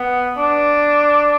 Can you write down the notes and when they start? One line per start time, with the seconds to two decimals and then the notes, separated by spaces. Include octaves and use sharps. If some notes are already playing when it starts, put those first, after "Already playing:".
Already playing: B3
0.37 D4